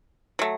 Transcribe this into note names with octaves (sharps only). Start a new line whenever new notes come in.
F#3 A3